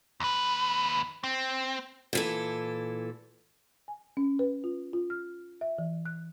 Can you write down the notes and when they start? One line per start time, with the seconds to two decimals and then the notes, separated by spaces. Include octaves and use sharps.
0.20 D#2 B4
1.24 C4
2.13 A#2 E3 A4
3.88 G#5
4.17 C#4
4.39 B4
4.64 F4
4.93 F4
5.10 F6
5.61 E5
5.78 E3
6.05 F#6